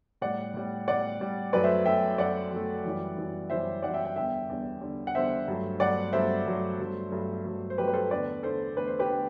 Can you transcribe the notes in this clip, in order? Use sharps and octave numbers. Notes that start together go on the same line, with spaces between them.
A2 G3 D5 F#5
A2 G3
A2 G3 D5 F#5
A2 G3
F#2 F#3 A3 B4 D5
C5 E5
F#2 F#3 A3 E5 G5
F#2 F#3 A3 D5 F#5
F#2 F#3 A3
F#2 E3 G3
F#2 E3 G3
F#2 E3 G3 C5 E5
F#2 E3 G3 D5 F#5
E5 G5
E5 G5
E2 D3 G3 E5 G5
E2 D3 G3
E2 D3 G3
F#5
E2 D3 G3 C5 E5
G2 F#3 A3
G2 F#3 A3 D5 F#5
G2 F#3 A3 C5 E5
G2 F#3 A3
G2 F#3 A3
G2 F#3 A3
G2 F#3 A3
C5
G2 F#3 A3 G4 B4
B4
A4 C5
E2 D3 A3 B4 D5
E2 D3 A3 A4 C5
E2 D3 A3 B4
C5
G4 B4
D3 A3